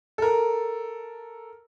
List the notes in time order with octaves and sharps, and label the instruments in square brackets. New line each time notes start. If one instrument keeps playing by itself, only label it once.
[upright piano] A4 A#4